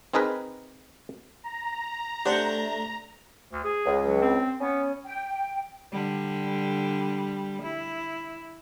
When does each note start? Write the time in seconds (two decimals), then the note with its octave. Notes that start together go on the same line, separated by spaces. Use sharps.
0.14 C4 D#4 G#4 A#4 B4
1.44 A#5
2.26 A3 D4 G4 C5 F#5
3.52 D2
3.64 G#4
3.86 C#2
4.07 F#3
4.22 C4
4.60 B3 C#4
5.05 G5
5.93 D3 G3
7.62 E4